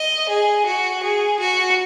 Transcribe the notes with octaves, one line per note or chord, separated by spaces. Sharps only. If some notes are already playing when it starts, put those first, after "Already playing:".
Already playing: D#5
G#4
F#4
G#4
F#4